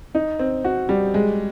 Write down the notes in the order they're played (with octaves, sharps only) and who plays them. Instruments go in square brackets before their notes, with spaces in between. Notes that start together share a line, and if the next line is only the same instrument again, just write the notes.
[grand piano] D#4
C4
F#4
G3
G#3